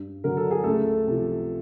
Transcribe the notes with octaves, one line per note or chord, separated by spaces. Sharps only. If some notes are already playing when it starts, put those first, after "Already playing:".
Already playing: G2
D3 F#3 A#4
A4
G#4
C#2 A3 A4
C3 F3